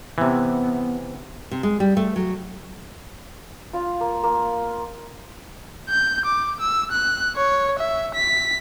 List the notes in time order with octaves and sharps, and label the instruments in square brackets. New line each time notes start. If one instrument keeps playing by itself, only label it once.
[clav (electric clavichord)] C3 E3 [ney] B3
[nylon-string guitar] C3
G#3
G3
A3
F#3
[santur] F4
A#3
A#3
[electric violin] G6
D6
E6
F#6
C#5
E5
B6